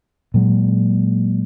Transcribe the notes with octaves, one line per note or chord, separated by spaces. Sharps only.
A#2 F#3 G#3